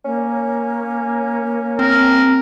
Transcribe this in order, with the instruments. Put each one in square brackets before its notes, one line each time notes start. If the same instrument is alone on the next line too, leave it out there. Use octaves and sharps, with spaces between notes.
[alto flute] A#3 [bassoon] C#4
[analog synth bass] C4 [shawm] A#4